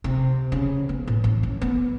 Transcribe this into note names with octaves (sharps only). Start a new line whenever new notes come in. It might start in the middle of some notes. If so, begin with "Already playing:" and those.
C3
C#3
B3
A2
A1
C#4
B3